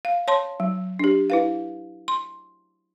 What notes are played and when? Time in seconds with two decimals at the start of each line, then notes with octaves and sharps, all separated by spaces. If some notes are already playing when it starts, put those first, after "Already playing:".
0.05 F5
0.28 C#5 A5 C6
0.60 F#3
0.99 D4 G4
1.30 E4 B4 F5
2.08 C6